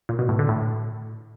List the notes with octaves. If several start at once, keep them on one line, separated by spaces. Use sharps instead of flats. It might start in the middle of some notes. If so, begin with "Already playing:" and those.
A#2
B2
A2
D3
A2